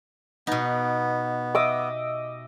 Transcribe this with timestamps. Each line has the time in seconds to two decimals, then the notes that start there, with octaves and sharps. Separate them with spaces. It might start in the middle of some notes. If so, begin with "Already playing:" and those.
0.47 B2 B3 D#4
1.55 D#5 E5 D6